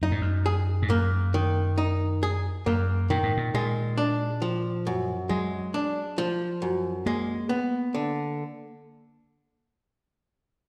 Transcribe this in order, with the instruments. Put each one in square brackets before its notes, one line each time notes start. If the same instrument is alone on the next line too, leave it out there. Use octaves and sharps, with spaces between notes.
[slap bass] F#2 [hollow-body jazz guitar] D#4
[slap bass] G#2
F#2
[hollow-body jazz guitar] G#4
[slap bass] G#2
[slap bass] F#2 [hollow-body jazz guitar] A#3
[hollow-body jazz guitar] D#3
D#4
G#4
[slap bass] F#2 [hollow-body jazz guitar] A#3
[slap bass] A#2 [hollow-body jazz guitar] D#3
[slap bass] G#2
A#2
[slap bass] A#2 [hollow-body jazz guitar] G#3
[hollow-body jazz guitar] D4
F3
F#2
[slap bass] F#3 [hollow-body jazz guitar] G#3
[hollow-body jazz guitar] D4
F3
F#2
[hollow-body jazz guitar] G#3 [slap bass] A#3
[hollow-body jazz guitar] B3
D3